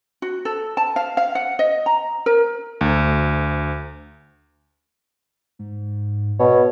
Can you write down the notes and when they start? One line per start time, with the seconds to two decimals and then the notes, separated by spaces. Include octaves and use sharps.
0.22 F#4
0.45 A4
0.77 A5
0.96 F5
1.17 F5
1.35 F#5
1.59 D#5
1.86 A#5
2.26 A#4
2.81 D2
5.59 G#2
6.39 B2 C#5